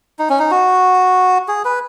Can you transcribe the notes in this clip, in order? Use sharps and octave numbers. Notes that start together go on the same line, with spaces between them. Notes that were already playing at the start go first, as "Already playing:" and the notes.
D#4
C#4
D#4
F#4
G#4
B4